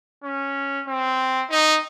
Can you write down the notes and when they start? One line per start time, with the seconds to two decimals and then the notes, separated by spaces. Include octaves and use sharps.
0.24 C#4
0.87 C4
1.50 D#4